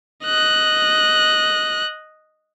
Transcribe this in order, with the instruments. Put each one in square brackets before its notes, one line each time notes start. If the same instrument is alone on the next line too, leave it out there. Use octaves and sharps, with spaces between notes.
[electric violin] D#5 F#6